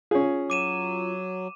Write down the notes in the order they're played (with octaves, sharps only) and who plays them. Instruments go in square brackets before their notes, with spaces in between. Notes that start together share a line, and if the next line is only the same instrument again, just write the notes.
[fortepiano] C#4 G#4 [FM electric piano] F4
[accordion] F#3 [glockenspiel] D6 D#7 E7